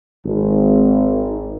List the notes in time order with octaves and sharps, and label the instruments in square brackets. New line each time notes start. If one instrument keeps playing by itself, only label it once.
[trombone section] G#1